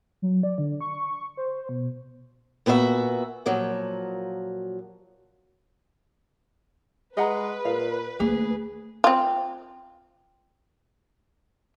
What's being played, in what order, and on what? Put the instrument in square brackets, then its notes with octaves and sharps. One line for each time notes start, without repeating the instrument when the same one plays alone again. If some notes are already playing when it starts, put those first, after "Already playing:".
[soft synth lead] F#3
D5
D3
C#6
C5
B2
[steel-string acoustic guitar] A#2 B3 F#4 C5 E5
A#2 F3 F#3
[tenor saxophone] G#3 [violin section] B4 [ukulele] D#5 F#5 A#5
[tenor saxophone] A#2 [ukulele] F5
[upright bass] D2 A#3 [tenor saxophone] G#4
[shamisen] C4 F4